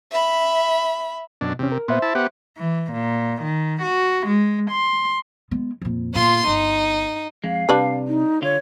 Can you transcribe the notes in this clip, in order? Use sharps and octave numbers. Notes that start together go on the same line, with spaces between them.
E5 B5
F#2 B2 D4
E2 C3 C#4
A#4
A#2 B3 C5 E5 C6
E4 A5
B3 G4 F#5
E3
A#2
D#3
F#4
G#3
C6
G#3 B3
F2 A#2
G1 A#2 F4 C6
G1 D#4
F2 G#3 F5
C3 G3 D4 B4
D#4
D3 F4 C#5